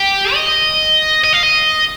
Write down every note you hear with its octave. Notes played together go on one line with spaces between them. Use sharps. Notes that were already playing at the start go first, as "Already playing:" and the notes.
Already playing: G4
D#5
D#5
F5
D#5